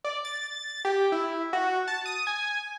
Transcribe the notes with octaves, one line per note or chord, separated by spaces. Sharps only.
D5
A6
G4
E4
F#4
A5
D#6
G#5